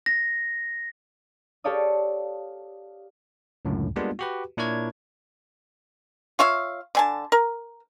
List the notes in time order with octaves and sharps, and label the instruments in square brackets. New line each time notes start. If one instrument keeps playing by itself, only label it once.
[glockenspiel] A#6
[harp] G4 A4 C#5 D5 F5 D#6
[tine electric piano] C#2 F#2 A2 D3
G3 G#3 A#3 B3 D4 F4
F#4 G4 B4
A#2 D4 E4 A#4 C#5 G#6
[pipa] F4 C#5 E5 F5
D3 G#5 A5
A#4